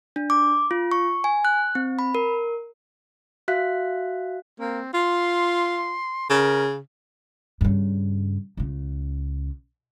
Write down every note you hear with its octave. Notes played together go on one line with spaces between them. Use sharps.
D4
D6
F4
C#6
G#5
F#6
C4
B5
A#4
F#4 E5 F5 F#6 B6
A#3 C4
F4 C6
C#3 A#4
G2 C#3
C#2 C#3